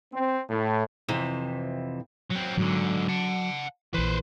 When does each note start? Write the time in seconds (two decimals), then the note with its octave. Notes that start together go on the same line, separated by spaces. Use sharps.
0.14 C4
0.50 A2
1.08 F2 C3 E3
2.30 F#3 C4
2.58 G#2 D3 F#3
3.09 F#5 A5
3.94 A#1 E3 B4 C5